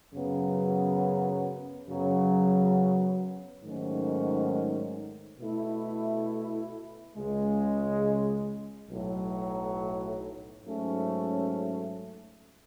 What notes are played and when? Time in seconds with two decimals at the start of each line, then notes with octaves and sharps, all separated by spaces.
0.14 F#2 C#3 F#3 B3
1.89 F#2 C#3 F#3 B3
3.64 G#2 D#3 F#3 A3 C#4
5.40 B2 A3 E4
7.15 C#2 C#3 G#3
8.90 B1 A2 F#3
10.66 G#2 F#3 A3 C#4